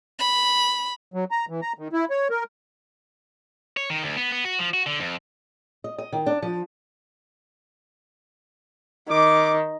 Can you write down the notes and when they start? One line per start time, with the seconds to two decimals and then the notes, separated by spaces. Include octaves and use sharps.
0.19 B5
1.14 F#3
1.31 A#5
1.49 E3
1.62 A#5
1.79 D#3
1.93 E4
2.10 C#5
2.30 A#4
3.77 C#5
3.90 D#3
4.03 D2
4.17 B3
4.32 B3
4.45 F#4
4.59 F3
4.74 F#4
4.86 D3
5.00 F2
5.84 D#5
5.98 D#5
6.12 D#3
6.26 D4
6.42 F3
9.10 D#3 D6